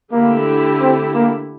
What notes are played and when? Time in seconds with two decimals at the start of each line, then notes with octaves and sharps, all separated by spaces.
0.12 D3 A3 A#3 E4 G4
0.80 C4
1.14 A#3